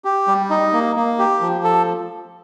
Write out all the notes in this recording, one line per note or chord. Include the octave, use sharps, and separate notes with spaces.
G4
G3
D#4
A#3
A#3
G4
F3
A4